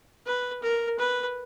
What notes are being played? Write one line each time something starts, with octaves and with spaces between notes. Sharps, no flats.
B4
A#4
B4